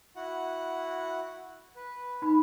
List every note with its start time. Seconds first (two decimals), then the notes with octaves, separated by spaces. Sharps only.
0.16 E4 F#4 F#5
1.76 B4
2.22 D#4 B5